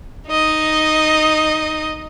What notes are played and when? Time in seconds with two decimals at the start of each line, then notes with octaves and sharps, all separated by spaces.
0.30 D#4 D#5